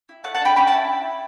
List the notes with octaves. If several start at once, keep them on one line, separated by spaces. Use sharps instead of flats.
E4
A3 F#5 A5
F#5 A5
D4 G5 B5
C#4 G5 B5
F#5 A5
E4